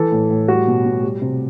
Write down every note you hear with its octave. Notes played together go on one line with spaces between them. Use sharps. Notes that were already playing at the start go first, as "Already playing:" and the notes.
Already playing: E3 A4
A2
A2
G3 F#4
B2
B2
G3
C3